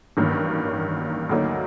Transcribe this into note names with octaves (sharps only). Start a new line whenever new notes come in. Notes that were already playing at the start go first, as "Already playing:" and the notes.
A1 G2 D#3 F#3 A#3
D2 D3 F#3 A#3 D#4